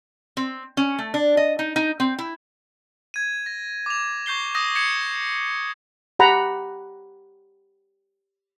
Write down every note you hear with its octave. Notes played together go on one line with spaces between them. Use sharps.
C4
C#4
A3
D4
D#5
D#4
D#4
C4
E4
G#6 D#7
A#6
D6 F7
C#6 G6 C7 G7
D#6 G6 A#6 D#7
G6 G#6 C7 C#7 D#7 E7
G4 F#5 A#5 B5